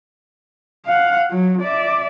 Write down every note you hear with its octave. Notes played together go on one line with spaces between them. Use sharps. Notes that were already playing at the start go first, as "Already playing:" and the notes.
F5 F#5
F#3
D5 E5